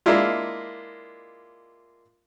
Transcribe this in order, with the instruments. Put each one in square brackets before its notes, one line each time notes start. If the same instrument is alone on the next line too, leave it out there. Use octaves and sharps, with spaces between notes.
[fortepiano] G#3 A#3 D4 E4 F4